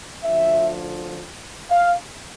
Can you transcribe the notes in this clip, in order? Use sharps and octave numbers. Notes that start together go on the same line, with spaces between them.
D2 D3 F3 E5
F5